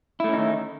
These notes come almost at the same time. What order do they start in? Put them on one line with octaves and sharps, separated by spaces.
E4 A3 C#4 D#4 D#3